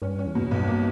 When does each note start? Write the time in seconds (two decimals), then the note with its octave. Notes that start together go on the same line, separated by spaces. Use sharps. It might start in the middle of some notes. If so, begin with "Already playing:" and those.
0.02 G2 C#4
0.19 C#4
0.26 E2
0.35 B2
0.51 B1 G2
0.68 A#3